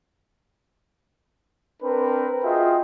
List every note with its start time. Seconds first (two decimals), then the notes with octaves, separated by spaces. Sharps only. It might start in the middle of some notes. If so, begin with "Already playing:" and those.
1.82 C4 D4 A#4 B4
2.43 F4 F#4 G#4 D#5 E5 G5